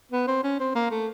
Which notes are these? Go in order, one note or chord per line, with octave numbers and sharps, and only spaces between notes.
B3
C4
C#4
C4
A#3
A3